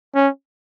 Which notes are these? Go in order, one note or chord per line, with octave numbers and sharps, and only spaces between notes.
C#4